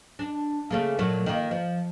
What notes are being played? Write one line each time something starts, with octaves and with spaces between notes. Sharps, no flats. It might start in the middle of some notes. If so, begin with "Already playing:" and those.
D4
C#3 A3 A#3
A#2 F#3 A3
D#3 A#3
F3